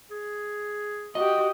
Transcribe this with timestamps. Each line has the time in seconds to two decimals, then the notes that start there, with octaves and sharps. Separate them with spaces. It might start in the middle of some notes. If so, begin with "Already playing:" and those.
0.11 G#4
1.15 F#4 G4 D#5 D#6